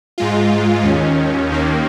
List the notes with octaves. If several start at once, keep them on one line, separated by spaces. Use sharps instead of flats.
G#2 G#3 F4
D#2 D#3 C#4
D#2 D#3 A#3